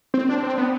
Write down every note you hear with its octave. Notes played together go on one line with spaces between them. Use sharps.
C4
D4
C4
B3